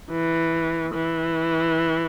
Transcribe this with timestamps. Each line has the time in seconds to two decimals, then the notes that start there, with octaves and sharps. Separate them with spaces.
0.11 E3
0.94 E3